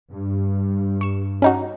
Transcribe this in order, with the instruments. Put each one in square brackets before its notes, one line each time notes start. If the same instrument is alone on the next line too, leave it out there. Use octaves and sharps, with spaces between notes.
[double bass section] G2
[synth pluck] C#6 E7
C#4 D#4 F#4